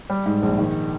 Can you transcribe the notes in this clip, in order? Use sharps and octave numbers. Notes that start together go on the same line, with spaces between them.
G3
G#2
A#1
D#3